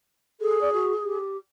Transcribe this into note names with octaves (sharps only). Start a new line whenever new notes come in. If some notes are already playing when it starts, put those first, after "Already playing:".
G#4 A4
D5
F#4
G4